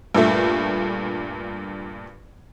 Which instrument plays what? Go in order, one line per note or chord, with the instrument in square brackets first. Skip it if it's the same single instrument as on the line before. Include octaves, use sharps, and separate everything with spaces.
[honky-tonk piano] G2 A#2 A3